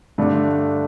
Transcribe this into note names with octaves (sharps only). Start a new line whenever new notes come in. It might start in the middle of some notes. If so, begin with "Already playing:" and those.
G2 D3 A3 D4